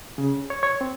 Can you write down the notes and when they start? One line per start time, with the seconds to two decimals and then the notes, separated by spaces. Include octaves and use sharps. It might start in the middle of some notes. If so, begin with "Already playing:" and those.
0.18 C#3
0.50 C#5
0.63 C#5
0.81 C4